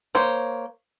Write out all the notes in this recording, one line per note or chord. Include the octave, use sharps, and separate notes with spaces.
A#3 C5 C#5